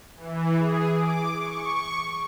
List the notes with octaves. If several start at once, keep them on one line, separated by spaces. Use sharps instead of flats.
E3
G#4
D6
C#6